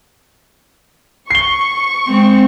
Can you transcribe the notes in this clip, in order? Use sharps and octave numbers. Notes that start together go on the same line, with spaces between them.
C#6 C7 G7
G#3 C4